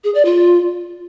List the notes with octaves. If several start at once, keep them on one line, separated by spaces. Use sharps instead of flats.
G#4
D5
F4